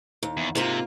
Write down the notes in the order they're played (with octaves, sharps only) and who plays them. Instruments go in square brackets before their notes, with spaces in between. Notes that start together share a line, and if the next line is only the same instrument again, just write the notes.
[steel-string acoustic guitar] D#2
[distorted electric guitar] E2
[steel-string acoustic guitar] G#2 A#3 F4 [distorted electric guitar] C3